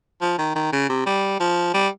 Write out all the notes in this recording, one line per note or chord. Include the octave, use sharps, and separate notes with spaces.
F3
D#3
D#3
C#3
C3
G3
F3
G3